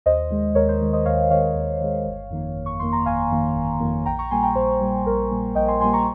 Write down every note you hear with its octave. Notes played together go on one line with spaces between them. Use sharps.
D#2 C5 D#5
D#3 G#3
D#2 A#4 C#5
C5
D#3 G#3
C5 D#5
D#2 C#5 F5
D#3 G#3 C#5 F5
D#2
D#3 G#3
G1
F2 D#3 A#3
G1
C#6
F2 D#3 A#3 C6
A#5
G1 F5 G#5
F2 D#3 A#3
G1
F2 D#3 A#3
A#1 G5 A#5
A#5 C#6
A#2 G3 A#3 G#5 C6
G5 A#5
A#1 C5
A#2 G3 A#3
A#1 A#4
A#2 G3 A#3
A#1 D#5 G5
G#5 C6
A#2 G3 A#3 G#5 C6
A#5 C#6